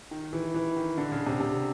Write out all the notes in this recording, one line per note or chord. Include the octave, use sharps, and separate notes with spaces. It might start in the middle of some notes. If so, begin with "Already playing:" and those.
D#3
E3
E3
D#3
D3
C#3
C3
C3